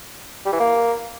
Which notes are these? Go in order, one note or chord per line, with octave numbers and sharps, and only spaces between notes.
G3
E3
A#3